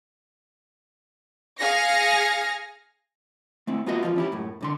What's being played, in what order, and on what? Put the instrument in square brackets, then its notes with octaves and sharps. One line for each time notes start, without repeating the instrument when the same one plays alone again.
[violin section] G#4 F5 G#5 A#6 C#7
[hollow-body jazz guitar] A3 C4 E4
A#3 B3 F4 F#4 D#5 E5
E2 G#2 F3 F4
C#4 E4 G4
F#2 A2
C2 D3 C6